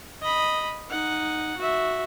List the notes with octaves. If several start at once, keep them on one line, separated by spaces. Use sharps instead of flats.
D#5 B5
D#4 F#5
F#4 E5